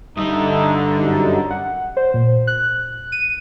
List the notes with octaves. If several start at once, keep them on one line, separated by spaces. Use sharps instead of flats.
G2 D3 G3 D#4 E5 D#6
F#2 C3 D#4
F#5
C5
A#2
F#6
D#7